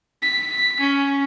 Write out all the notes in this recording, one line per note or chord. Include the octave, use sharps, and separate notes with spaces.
B6
C#4